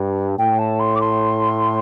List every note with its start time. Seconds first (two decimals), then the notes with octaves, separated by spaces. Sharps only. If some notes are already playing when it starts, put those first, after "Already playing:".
Already playing: G2
0.38 A2 G5
0.58 A5
0.79 C6
0.95 D6
1.00 C6